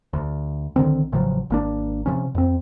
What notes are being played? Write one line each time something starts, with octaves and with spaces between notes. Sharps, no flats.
D2
B1 D3 D#3 C4
A1 C#3 F3 F#3
G#1 A#3 D4
C3 F3 C#4
F2 C4